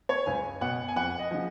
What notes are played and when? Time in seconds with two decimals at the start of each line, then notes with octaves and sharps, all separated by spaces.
0.09 C#5
0.26 C#2 G#5
0.61 B2 F#5
0.88 G#5
0.96 F2 F#5
1.19 D#5
1.31 C#3 F3